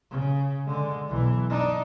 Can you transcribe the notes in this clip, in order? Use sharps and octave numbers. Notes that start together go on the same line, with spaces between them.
C#3
D3 G#3
B1 E3
D4 D#4